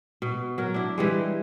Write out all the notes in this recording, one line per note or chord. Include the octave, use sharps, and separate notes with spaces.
B2
F#3 A#4
D4 E4
E3 G3 G#3